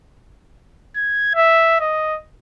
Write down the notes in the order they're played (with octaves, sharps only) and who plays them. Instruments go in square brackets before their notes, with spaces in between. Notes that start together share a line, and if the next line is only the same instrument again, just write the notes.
[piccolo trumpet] G#6
E5
D#5